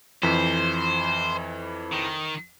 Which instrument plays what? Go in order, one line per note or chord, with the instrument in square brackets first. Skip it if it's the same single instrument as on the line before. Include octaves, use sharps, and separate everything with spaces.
[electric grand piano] F2 E3 B6 [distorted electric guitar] C5
[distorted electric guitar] D#3